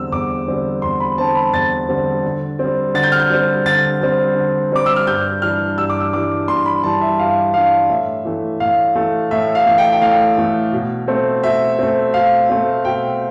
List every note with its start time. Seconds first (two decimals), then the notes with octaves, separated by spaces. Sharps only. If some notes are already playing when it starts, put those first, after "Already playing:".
Already playing: E2 D3 G3 C4 E6
0.12 E2 D6
0.48 D3 G3 C4
0.82 E2 C6
1.00 B5
1.18 D3 G3 C4 A5
1.35 B5
1.53 E2 A6
1.89 D3 G3 C4
2.24 D3
2.59 G3 C4
2.94 D3 A6
3.03 G6
3.12 F6
3.20 G6
3.30 G3 C4
3.66 D3 A6
4.01 G3 C4
4.36 D3
4.72 G3 C4 D6
4.86 E6
4.96 F6
5.07 G2 G6
5.42 E3 G3 D4 F6
5.77 G2 E6
5.90 D6
6.01 E6
6.13 E3 G3 D4 D6
6.48 G2 C6
6.66 B5
6.83 E3 G3 D4 A5
7.01 E5
7.19 G2 F5
7.54 E3 G3 D4 F5
7.90 A2 E5
8.25 E3 A3
8.60 A2 F5
8.96 E3 A3
9.31 A2 E5
9.55 F5
9.66 E3 A3
9.78 G5
9.92 G5
10.01 A2 F5
10.37 E3 A3
10.72 B2
11.08 A3 C4
11.43 B2 E5
11.79 A3 C4
12.14 B2 F5
12.50 A3 C4
12.85 B2 G5